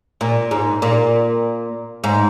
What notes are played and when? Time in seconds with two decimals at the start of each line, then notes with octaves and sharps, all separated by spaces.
0.21 A#2
0.51 G#2
0.82 A#2
2.04 G#2